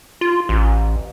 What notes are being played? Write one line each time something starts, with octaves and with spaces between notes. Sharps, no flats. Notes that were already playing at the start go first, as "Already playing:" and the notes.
F4
A1